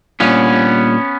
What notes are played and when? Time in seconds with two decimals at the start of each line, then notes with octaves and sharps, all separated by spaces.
0.20 A#2 G3 A#3 B3 C#4 D4 F4